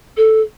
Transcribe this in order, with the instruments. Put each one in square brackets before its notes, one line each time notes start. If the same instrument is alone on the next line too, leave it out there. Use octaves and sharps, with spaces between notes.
[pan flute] A4